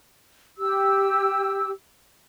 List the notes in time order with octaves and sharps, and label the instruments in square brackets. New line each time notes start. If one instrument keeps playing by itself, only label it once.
[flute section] G4 E6